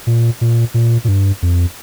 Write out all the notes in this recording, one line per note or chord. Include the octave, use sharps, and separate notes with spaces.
A#2
A#2
A#2
A#2
G2
F2